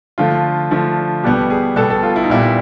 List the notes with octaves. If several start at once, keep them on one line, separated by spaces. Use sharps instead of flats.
D3 F3 A3 F4
D3 F3 A3
B2 G3 B3 G4
G#4
B2 G3 B3 A4
A4
F4
E4
D#4
A#2 G3 B3 E4